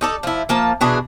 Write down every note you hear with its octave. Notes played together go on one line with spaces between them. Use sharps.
D#4 A4 D5
F3 E4
F3 A#3 A5
B2 E3 D4 G#4